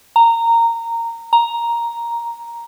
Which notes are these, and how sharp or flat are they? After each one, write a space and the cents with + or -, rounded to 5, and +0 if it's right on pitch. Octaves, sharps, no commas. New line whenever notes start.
A#5 -15
A#5 +5